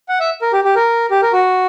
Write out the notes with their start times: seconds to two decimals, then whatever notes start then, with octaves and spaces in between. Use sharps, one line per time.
0.09 F#5
0.20 E5
0.42 A#4
0.53 G4
0.64 G4
0.75 A#4
1.11 G4
1.22 A#4
1.33 F#4